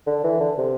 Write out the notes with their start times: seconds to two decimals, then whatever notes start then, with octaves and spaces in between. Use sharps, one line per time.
0.07 D3
0.24 E3
0.40 D3
0.58 C3